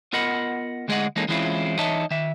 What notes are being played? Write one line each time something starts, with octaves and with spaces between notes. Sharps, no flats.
B3 F4 A#4 D#5 F#5 B5
D2 G#3 G#4 D5 D#5 F#5
E3 G#3 A#3 C#4 D#4 A4
E3 G#3 C4 C#4 E4 F4
E3 D#4 C#5 D#5 E5 A5
D#3 E5